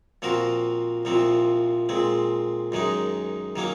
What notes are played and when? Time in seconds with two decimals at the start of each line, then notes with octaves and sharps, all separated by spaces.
0.22 A#2 F3 C4 F#4 A#4
1.05 C2 A#2 F3 C4
1.89 A#2 G#3 C4
2.72 F#2 D#3 G#3 D#4
3.56 D#3 F#3 A#3 C#4